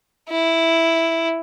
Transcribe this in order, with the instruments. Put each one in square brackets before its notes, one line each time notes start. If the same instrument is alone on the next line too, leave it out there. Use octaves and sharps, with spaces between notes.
[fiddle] E4